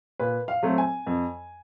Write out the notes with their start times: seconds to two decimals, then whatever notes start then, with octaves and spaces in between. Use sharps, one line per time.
0.20 A#2 B4
0.48 F5
0.63 F#3 A3 C4
0.78 G#5
1.07 F2